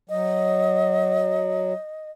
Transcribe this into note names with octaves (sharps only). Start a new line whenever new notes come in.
F#3 D#5